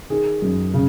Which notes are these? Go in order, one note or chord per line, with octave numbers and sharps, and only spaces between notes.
D#3 G#4
F#2
C#3